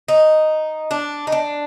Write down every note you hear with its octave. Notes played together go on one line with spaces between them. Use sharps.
D#4
D4
D#4
D4